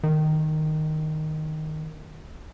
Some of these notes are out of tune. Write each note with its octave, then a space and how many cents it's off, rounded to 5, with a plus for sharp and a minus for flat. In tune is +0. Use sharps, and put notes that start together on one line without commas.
D#3 -5